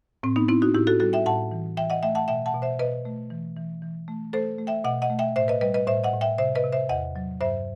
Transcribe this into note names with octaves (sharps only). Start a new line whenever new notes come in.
A2 C4
B3 D#4
A2 C4 E4
D#4 F#4
A2 E4 G4
F#4 A4
G3 F#4 A4
E5 G5
A2 F#5 A5
E3
E3 E5 G5
D#5 F#5
A3 E5 G5
F#5 A5
B2 E5 G5
F#5 A5
B2
C5 E5
B2 B4 D#5
A3
E3
E3
E3
A3
A3 A4 C5
A3
E5 G5
B2 D#5 F#5
D#5 F#5
A3
E5 G5
A2 C5 E5
B4 D#5
G3 B4 D#5
B4 D#5
A2 C5 E5
D#5 F#5
A2
E5 G5
C3 C5 E5
B4 D#5
C3
C5 E5
E2 D#5 F#5
F#3
G2 C5 E5